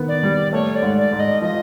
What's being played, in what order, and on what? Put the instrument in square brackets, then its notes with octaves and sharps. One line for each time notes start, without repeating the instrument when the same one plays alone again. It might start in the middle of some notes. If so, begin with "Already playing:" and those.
Already playing: [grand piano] D#3 B3
[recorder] D5
[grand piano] G3
[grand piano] A3 [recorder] C#5
[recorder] D5
[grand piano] G#2
[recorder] D5
[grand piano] G#2
[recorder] D#5
[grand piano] F3 [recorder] D#5